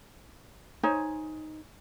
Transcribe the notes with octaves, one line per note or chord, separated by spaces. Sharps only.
D#4 C5 C#5 G#5